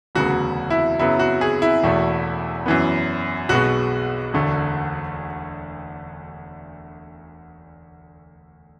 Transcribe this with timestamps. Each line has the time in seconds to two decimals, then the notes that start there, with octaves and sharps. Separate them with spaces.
0.15 E1 D2 C#3 F#3 B3 F#4
0.70 E4
0.99 F#2 C#3 F#3 B3 E4
1.19 F#4
1.41 G#4
1.62 E4
1.83 E1 E2 B2 A3
2.66 F#2 E3 B3
3.49 B1 B2 G#3 B3 F#4
4.33 E1 D2 D3 A3